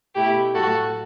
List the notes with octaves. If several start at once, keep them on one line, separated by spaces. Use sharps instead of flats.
B2 A3 E4 G4
A2 F#3 A3 F#4 A4